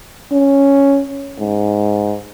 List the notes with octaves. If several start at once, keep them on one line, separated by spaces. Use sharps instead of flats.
C#4
G#2